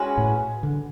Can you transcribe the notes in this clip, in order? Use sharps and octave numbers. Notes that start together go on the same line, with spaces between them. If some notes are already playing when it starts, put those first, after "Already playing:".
Already playing: G#3 C#4 F#4 B4
A2
D3